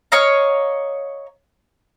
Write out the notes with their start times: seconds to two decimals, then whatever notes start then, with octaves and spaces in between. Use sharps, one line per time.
0.12 C#5 D#5 F5 A#5